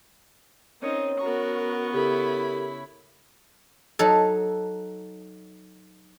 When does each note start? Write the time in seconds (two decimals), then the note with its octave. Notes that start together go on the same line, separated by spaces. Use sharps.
0.82 C4 C#4 D#4 A#4 C#5
1.20 B3 F#4 A#4 A#5 C#6
1.94 C#3 E4 G4 A4 A#4 B5
3.99 F#3 D#4 A4